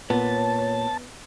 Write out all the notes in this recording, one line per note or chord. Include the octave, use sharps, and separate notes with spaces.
A#2 B3 C#5 A5